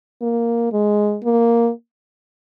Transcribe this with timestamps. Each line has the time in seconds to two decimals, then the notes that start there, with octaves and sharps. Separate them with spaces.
0.22 A#3
0.72 G#3
1.24 A#3